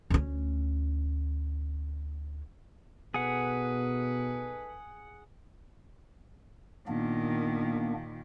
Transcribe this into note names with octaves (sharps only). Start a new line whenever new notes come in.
D2 C#4
B2 D#4 G#4 A4 B4 F#5
A#2 D#3 A#3 B3 D4